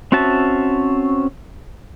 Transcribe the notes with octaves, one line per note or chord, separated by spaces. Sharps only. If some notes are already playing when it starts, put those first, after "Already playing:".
C4 C#4 F#4 E5 A5